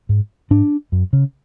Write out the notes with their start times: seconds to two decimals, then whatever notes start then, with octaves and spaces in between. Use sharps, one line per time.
0.09 G#2
0.51 G#2 D4
0.92 F#2
1.13 C#3